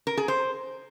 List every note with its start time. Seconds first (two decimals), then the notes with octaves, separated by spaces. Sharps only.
0.07 A#4
0.17 G#4
0.28 C5